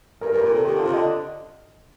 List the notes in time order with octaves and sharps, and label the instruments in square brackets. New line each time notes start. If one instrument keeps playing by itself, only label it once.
[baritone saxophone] G2 [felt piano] A#4
[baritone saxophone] G2 [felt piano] A#4
[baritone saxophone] A#2
[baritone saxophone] C3 [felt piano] A4
[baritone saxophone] D#3 [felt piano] G4
[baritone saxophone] D3 [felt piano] F4
[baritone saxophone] C3
[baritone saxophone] D3 [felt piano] D#5